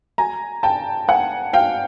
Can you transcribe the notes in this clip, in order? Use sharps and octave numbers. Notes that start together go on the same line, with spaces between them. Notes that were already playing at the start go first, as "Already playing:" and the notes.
G#5 A#5
G5 A5
F#5 G#5
F5 G5